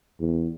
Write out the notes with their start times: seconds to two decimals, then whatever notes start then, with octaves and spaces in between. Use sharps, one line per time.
0.20 E2